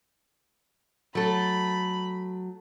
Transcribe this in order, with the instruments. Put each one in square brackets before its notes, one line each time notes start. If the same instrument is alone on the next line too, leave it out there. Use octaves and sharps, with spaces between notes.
[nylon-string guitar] F#3 [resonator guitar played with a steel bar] A3 A4 [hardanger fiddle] B5